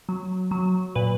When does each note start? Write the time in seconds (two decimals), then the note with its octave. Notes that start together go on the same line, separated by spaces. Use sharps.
0.09 F#3
0.51 F#3
0.95 A#2 B4